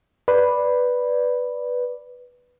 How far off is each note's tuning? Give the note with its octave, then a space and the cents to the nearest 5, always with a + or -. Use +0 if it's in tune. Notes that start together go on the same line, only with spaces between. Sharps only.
B4 +0 D5 +0